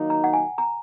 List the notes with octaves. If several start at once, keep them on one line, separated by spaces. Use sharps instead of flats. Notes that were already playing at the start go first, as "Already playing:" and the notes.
Already playing: D#3 F#3 A#3 D#4
A#5
F#5
G#5
A#5